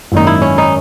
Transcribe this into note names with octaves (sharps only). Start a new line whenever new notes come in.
G#1 F#2 D#3 A#3 D#4
E4
C#4
D#4